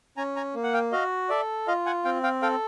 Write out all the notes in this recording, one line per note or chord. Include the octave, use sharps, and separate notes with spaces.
C#4 G#5 A#5
G#5 A#5
A#3
F#5
F5 G5
F#4 D#5 F5
A4 D5 E5
F4 D#5 F5
F#5 G#5
C4 F5 G5
F5 G5
A4 F5 G5